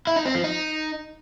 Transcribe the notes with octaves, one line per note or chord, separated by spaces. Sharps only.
E4
D#4
C4
F3
D#4